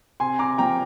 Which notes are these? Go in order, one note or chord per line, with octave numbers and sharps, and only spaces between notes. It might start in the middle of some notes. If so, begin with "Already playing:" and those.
C3 G#5 C6
A#5 D6
F3 A#3 G5 A#5